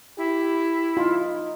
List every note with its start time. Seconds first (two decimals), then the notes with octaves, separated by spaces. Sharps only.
0.18 E4 G4
0.97 D#4 F4